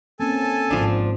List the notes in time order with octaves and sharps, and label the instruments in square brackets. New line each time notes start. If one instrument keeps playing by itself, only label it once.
[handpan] A#3 C4 C#4 [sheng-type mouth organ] A4 G#5 A5
[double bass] G#1 G#2 [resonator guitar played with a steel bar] F3 D4